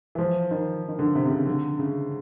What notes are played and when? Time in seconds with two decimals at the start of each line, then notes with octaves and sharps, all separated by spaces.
0.15 E3
0.18 F3
0.51 D#3
0.88 D#3
0.99 D3
1.15 C3
1.25 C3
1.31 C#3
1.46 D3
1.79 C#3